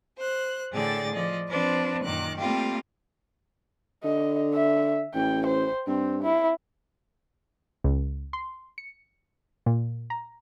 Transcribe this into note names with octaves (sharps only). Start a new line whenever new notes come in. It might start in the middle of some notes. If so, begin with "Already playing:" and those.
C5 F#6
A2 D3 G#4 D5 G5 A6
F3 D5 D#5
F3 C4 D4 B4 C5
F#2 A#2 D#3 D6 F#6
G3 A3 A#3 C4 F4 G4
D3 D#5
E5
A1 G5
C5
G2 C4
E4
C#2
C6
C#7
A#2
A#5